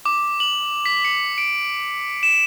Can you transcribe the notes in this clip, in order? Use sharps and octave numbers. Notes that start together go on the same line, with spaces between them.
D6
F#7
B6
C#7
D7
E7